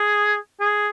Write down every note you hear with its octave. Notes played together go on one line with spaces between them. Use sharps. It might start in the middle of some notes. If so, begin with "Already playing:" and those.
Already playing: G#4
G#4